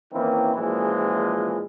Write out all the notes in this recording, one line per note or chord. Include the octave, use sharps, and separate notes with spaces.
D#3 E3 A#3 C4 C#4 E4
A#1 F#2 A#2 E3 F3 G#3